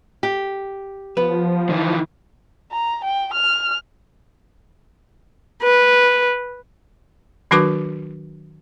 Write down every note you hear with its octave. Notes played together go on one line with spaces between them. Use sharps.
G4
F3 B3 B4
D#3 E3
A#5
G5
F6
B4
D#3 F#3 D4 F#4 B4 D6